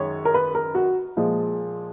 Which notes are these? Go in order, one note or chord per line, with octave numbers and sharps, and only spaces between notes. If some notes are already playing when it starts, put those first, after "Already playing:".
Already playing: F#2 D#3 G#3 C#5
A#4
B4
A#4
F#4
A#2 F3 G#3